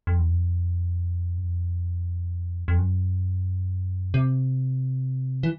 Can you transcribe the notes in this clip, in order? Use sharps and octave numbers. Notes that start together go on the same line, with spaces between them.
F2
E2
F2
F#2
F2
F2
F#2
C3
E3